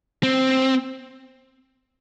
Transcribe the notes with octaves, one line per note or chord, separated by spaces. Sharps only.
C4